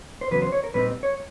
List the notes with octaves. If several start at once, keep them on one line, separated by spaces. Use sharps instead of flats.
C5
E2 C#3 F#3 B4
C5
C#5
A#4
A#2 G3 C4 D#4 B4
C#5